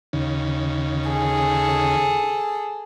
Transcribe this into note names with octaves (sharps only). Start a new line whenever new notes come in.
D#2 C#3
G#4 A4